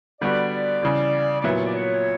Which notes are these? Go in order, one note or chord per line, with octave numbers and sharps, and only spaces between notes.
D3 G3 B3 F#4 D5
C#3 E3 G3
D5
A#2 F#3 B3 E4 B4 C#5
C#5
D5
C#5